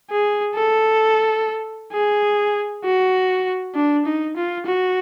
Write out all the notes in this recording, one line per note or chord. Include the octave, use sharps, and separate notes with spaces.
G#4
A4
G#4
F#4
D4
D#4
F4
F#4